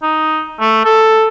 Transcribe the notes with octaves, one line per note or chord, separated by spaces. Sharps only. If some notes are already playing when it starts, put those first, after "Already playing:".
D#4
A3
A4